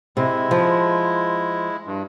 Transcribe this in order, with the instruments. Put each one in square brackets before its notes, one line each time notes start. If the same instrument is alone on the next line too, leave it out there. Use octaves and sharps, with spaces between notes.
[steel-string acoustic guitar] C3 [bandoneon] G#3 E4
[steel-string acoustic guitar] F3
[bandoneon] G2